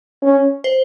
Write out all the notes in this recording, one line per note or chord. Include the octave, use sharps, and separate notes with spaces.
C#4
C5